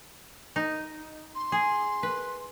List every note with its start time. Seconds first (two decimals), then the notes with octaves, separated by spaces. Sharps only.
0.56 D#4
1.35 C6
1.52 G#4
2.03 B4